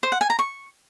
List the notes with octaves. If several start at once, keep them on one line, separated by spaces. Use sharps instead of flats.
C5
F#5
G#5
A#5
C#6